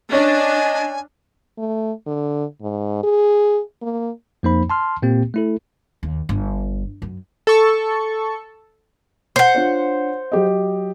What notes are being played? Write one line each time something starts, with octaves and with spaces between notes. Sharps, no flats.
C#4 D4 D#5 G#5
A3
D3
G#2
G#4
A#3
F2 F3 A#3 D#4 C5 B5
A5 C6 F6
A#2 A#3 C4 G4
A3 E4 A4
D#2
G1
F#2
A4 C#6
C5 F#5
D4 F4 C#5
F#3 G4 D#5